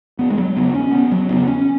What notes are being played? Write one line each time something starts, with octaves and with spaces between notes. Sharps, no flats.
E1 B3
G#3
F#3
E2 C#3 B3
C#4
E1 B3
F#3
E2 C#3 B3
C#4